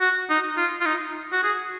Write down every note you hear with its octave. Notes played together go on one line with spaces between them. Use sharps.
F#4
D#4
F4
F4
D#4
F#4
G#4